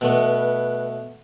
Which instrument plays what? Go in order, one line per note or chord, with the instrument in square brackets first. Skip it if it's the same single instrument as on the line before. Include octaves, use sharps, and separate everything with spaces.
[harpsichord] B2 A3 B3 [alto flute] B4